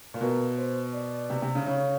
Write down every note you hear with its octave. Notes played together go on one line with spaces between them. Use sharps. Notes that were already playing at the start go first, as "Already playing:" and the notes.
A#2
B2 A#4
C5
D5
C3
C3
C#3
C#3 C#5